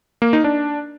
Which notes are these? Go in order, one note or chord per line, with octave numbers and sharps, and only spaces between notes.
A#3
D#4
D4